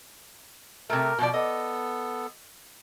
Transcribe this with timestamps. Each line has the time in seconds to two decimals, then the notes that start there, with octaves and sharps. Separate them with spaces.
0.90 C3 A3 A#4
1.19 B2 F3 D5
1.33 B3 A4 D#5